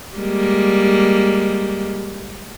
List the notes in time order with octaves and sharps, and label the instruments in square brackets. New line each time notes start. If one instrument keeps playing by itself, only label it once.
[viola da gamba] G3 G#3 A#3